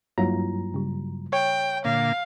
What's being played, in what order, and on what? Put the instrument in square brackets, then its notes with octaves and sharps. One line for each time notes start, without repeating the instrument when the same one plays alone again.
[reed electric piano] G2 F#3 A#5 [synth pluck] A#3 E4 F4
[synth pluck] C#3 G3
[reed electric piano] C#5 [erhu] G5
[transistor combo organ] A#2 D3 A#3 [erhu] F5